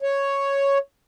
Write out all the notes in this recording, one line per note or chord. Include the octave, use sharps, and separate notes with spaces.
C#5